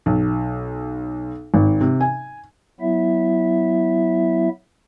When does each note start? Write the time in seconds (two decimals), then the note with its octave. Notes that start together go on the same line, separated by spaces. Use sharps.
0.06 B1
1.54 G#1
1.81 C3
2.01 G#5
2.81 F#3 B3 E4 E5